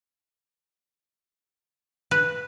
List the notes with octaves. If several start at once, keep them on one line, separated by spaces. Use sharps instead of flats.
B4